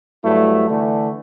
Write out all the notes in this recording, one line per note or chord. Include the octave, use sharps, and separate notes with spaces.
G2 F#3 A3 E4
D3 E3 A3